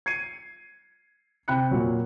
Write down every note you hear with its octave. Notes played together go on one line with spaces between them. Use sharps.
G#6 C7 C#7 D#7
C3 G5 B5 F#6 C#7
A#2 F#3